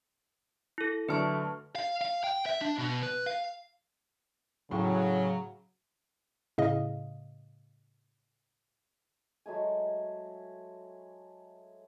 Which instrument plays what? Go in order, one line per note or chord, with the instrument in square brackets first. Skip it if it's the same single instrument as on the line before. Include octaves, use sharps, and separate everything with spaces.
[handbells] E4 A4
[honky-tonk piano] D3 F#3 F6 [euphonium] A3 [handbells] B4 A5 C#6
[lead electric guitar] F5
F5
G5
E5
D4
B2
B4
F5
[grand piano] A2 [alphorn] C#3 [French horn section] F#3
[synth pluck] A2 C#3 D#5 F5
[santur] F#3 G#3 A3 G#5